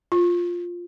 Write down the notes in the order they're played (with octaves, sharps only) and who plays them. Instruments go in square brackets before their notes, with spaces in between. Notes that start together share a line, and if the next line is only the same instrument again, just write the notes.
[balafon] F4